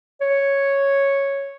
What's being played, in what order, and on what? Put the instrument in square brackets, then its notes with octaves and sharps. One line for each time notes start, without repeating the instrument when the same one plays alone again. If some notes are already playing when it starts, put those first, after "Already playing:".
[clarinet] C#5